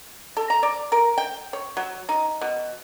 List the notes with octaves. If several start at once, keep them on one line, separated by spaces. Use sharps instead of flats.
A4
A#5
D5
A#4
G5
C#5
F#3
D#4
B2